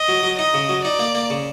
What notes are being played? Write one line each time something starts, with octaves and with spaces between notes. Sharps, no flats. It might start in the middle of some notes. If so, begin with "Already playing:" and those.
Already playing: D#5
F#3
F#3
D#4 D#5
C#3
F#3
D#4 D5
A#3
A#3
C#3